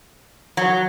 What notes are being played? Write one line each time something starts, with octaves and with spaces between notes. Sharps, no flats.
F#3